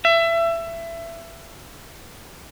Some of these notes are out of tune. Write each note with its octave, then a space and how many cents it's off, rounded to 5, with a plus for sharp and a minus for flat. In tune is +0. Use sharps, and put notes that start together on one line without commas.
E5 +25